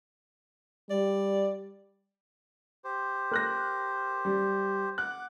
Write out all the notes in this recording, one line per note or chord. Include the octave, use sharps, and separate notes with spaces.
G3 D5
G4 C5
A#4 F#6 A#6
G3
F#5 D6 F#6